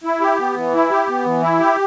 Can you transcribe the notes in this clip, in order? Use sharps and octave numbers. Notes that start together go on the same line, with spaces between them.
E4
G4
B3
E3
E4
G4
B3
E3
E4
G4